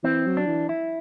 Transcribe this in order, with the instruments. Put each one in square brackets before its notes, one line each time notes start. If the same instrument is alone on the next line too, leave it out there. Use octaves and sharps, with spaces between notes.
[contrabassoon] E3 [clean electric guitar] C4
[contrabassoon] F#3
[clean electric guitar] D4
[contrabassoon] E3
[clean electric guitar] E4